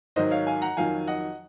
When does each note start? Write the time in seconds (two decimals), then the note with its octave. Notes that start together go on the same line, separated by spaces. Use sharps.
0.16 G#2 D#3 F#3 C5 D#5
0.31 C#5 F5
0.47 F5 G#5
0.62 F#5 A#5
0.77 F2 D#3 F#3 F5 G#5
1.07 D#5 F#5